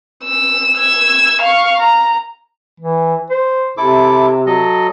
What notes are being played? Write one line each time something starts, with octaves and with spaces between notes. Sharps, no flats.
E6
E6 G#6
F5 C#6
A#5
E3
C5
C3 E4 A4 D6
F#3 A4 D#5